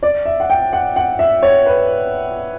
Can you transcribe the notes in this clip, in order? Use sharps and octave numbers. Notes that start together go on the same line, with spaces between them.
D5
E5
F#5
G5
F#5
F#5
E5
C#5
B4